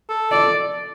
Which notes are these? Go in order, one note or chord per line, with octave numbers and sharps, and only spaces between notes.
A4
D5